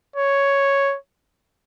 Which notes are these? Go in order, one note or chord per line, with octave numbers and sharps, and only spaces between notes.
C#5